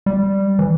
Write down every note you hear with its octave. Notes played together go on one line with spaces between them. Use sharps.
G3
E3